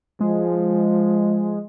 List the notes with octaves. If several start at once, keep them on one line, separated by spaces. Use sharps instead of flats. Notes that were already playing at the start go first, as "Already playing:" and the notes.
F3 G#3